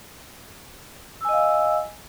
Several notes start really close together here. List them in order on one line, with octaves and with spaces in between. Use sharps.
E6 G#5 D#5 F5